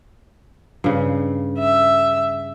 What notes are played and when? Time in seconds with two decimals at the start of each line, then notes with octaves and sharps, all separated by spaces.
0.84 G2 C#3
1.59 E5